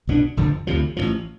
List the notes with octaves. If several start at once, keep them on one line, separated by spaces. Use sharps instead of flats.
C2 B2 B3 D4
F1 F2 D3 F3
D2 C3 F3
A1 G2 F3